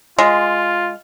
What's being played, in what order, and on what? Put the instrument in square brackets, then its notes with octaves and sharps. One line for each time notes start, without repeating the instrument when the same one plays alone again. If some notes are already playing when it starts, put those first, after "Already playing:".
[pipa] G#3 [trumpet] F4